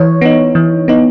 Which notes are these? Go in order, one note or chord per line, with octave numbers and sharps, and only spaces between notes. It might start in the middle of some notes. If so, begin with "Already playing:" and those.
Already playing: E3 C#5
B3 D#4
E3
B3 D#4